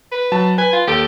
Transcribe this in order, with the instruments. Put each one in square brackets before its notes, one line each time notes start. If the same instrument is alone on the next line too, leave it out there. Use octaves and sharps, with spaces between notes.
[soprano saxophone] B4
[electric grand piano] F#3 A5
[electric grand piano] B4 [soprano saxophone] G#5
[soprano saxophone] F4
[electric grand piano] D#2 A4 D7 [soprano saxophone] G4